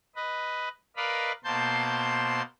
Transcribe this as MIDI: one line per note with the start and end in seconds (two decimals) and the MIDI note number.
0.16 0.68 71
0.16 0.68 75
0.96 1.32 70
0.96 1.32 71
0.96 1.32 74
0.96 1.32 75
0.96 1.32 77
0.96 1.32 83
1.44 2.42 47
1.44 2.42 58
1.44 2.42 72
1.44 2.42 81
1.44 2.42 84
1.44 2.42 91